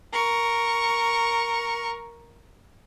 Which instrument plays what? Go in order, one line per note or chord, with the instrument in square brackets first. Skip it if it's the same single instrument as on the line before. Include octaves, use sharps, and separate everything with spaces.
[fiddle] A#4 C#6